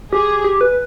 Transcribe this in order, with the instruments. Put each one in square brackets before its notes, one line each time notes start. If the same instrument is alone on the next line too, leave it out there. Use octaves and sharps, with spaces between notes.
[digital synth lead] G4 [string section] G#4
[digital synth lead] G4
B4